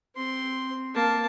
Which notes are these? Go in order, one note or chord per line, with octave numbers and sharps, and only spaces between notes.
C4 C6
A#3 A5